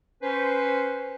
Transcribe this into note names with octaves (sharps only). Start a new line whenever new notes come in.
C#4 B4 C5